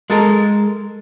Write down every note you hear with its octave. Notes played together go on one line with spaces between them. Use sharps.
G#3 A4 A#4